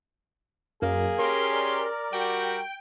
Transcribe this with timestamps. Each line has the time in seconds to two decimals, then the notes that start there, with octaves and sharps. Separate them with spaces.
0.82 F#2 A#3 G#4
1.19 C#4 G4 A#4 C6
1.53 D5
2.13 G3 F#4 A#4 G5